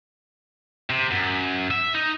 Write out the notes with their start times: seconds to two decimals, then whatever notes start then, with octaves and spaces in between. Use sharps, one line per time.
0.90 C3
1.11 F#2
1.71 E5
1.94 D#4